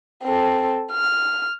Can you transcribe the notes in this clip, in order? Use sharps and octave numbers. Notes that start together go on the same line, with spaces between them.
C4 A4
F6